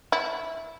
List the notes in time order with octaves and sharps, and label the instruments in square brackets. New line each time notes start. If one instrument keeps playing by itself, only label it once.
[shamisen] E4